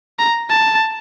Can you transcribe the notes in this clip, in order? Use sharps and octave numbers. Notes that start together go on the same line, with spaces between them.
A#5
A5